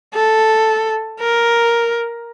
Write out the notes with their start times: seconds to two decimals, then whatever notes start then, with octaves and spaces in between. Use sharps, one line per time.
0.15 A4
1.20 A#4